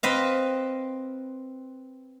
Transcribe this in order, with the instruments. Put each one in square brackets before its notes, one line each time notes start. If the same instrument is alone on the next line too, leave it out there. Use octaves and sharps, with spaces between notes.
[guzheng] C4 B4 D#5 F5